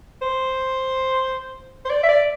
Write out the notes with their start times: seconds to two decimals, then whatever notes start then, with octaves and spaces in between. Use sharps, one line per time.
0.22 C5
1.85 C5
1.90 D5
2.03 E5
2.09 D5